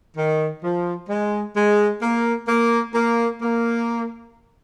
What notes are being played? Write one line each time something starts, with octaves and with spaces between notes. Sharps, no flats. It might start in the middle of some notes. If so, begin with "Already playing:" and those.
D#3
F3
G#3
G#3
A#3
A#3
A#3
A#3